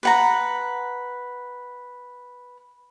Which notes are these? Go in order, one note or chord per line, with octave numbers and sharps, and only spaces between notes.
B4 F#5 A#5